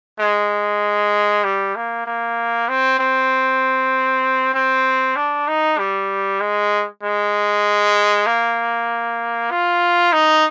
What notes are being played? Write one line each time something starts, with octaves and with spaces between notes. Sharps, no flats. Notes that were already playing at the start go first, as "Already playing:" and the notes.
G#3
G3
A#3
A#3
C4
C4
C4
D4
D#4
G3
G#3
G#3
A#3
F4
D#4